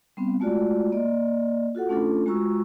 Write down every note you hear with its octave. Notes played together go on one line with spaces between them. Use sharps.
G3 B3 C4
G#3 A3 F4 F#4 D5
A#3 D5 D#5
F4 F#4 A4 F#5
A3 C#4 D4 F4 A4
G#3 F4 F#4 A#5 C#6 E6